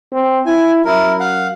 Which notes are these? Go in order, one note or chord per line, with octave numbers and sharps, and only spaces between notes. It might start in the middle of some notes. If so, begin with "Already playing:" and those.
C4
E4 G#5
F#2 E4 A#4
F5 F#5